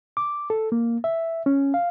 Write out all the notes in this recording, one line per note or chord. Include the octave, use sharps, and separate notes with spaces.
D6
A4
A#3
E5
C#4
F5